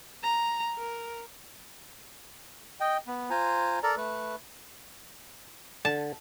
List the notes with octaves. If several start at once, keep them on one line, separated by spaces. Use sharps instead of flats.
A#5
A#4
D#5 G5
B3
F4 C5 G#5 A#5
A4 A#4 D5 A#5
A3 B4
D3 A5